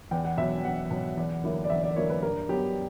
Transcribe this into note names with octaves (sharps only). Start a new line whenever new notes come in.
E2 G5
F#5
B2 F#3 E5
E2 F#5
B2 F#3
E2
D3 F#3 A#3 E4
D5
E2 E5
D5
D3 F#3 A#3 E4 C#5
B4
G2 A#4
F#3 B3 G4